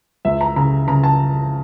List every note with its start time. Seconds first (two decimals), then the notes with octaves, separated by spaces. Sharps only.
0.25 C#2 E5
0.41 A#5
0.56 C#3 A#5
0.88 C#3 A#5
1.04 A5